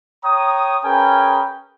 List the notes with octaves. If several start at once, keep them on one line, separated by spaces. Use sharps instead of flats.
C#5 G5 A#5 D#6
C#4 G#4 A#4 B4 G5 G#5